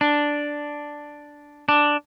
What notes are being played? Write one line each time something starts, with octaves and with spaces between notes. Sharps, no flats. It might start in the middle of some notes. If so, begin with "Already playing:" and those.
D4
D4